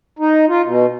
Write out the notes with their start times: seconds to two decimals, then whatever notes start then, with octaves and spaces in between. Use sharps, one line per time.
0.19 D#4
0.49 F4
0.64 B2